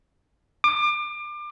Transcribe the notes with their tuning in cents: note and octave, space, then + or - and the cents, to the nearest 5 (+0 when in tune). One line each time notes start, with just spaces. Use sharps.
D6 +30